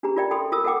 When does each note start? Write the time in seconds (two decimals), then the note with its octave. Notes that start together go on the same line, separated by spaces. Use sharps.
0.03 C#4 D4 G4 G#4 B4 A#5
0.16 F4 A#4 D5 E5 G5
0.31 A4 G5 B5 C6 D#6
0.52 F4 A#4 D#6 E6
0.64 A4 A#4 E5 F#5 G5 D6